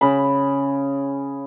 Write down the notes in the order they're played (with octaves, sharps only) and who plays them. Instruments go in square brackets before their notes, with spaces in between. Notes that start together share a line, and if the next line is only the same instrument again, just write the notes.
[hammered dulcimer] C#3 B5